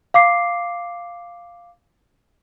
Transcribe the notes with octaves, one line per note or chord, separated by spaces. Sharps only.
F5 D6 C7